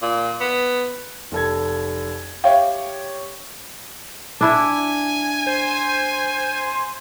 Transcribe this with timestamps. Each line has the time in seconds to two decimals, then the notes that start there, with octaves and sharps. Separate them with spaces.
0.02 A#2
0.40 B3
1.32 F1 A4 G#6
2.44 G4 C#5 E5 F5 G5
4.41 D4 E4 E5 G#5
5.47 C5